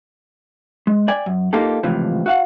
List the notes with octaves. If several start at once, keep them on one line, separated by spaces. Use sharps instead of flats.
G#3
D5 G5 G#5
F#2
A#3 D#4 F4 G4 A4
C#2 A2 C3 E3 F3
F#4 F5 F#5